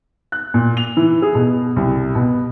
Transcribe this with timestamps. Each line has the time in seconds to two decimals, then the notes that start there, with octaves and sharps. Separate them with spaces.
0.32 F#6
0.54 A#2
0.77 F7
0.97 E3
1.22 G#4
1.35 B2
1.76 C2
2.15 B2